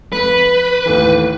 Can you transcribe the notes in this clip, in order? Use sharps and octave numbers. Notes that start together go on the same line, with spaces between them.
F2 B4
D#2 A2 E3